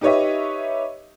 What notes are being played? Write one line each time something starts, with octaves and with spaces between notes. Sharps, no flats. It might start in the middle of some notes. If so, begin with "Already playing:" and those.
D#4 G4 B4 C#5 D#5 E5